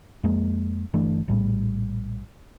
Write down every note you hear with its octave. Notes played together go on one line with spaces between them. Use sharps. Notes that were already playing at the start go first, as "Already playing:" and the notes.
F2 G#3 A#3
G1 E3 A3 D4
A#1 A2 G3